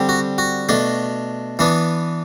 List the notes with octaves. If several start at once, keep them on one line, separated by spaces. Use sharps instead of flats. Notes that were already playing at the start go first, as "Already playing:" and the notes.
Already playing: D3 G3 C4
F#4
F#4
B2 A3 D4
E3 B3 D4